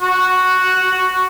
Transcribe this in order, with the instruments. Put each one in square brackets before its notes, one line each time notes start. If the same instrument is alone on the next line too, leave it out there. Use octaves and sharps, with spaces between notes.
[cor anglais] F#4